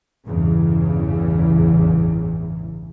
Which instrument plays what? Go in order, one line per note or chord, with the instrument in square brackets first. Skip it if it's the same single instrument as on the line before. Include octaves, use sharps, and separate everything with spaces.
[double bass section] A1 E2 G2 C#3 E3